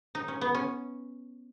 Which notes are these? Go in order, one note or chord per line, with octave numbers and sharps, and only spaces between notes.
D#4
C#4
B3
C#4